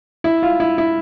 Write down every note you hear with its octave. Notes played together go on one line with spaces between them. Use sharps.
E4
F4
E4
E4